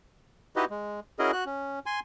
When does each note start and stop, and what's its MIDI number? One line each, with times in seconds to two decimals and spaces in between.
0.56 0.65 63
0.56 0.65 64
0.56 0.65 66
0.56 0.65 67
0.56 0.65 71
0.56 0.65 75
0.70 1.00 56
1.19 1.31 61
1.19 1.31 64
1.19 1.31 66
1.19 1.31 68
1.19 1.31 70
1.19 1.31 75
1.33 1.44 66
1.33 1.44 90
1.46 1.79 61
1.86 2.00 80
1.86 2.00 84